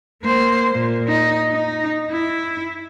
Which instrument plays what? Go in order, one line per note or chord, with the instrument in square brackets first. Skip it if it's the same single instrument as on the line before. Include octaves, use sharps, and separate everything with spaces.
[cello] A#3 C5
A#2
D#4
D#4
E4